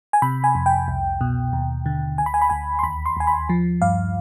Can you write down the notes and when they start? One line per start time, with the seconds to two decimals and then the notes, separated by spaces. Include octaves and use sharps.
0.13 G#5
0.22 C3 B5
0.44 G#5
0.55 F2
0.66 G5
0.88 C2
1.21 B2
1.53 D#2
1.86 D3
2.18 D2 G#5
2.26 B5
2.34 G#5
2.41 B5
2.50 D2 G#5
2.79 C6
2.83 D#2 B5
3.06 C6
3.17 D#2 G#5
3.27 B5
3.49 F3
3.82 G2 F5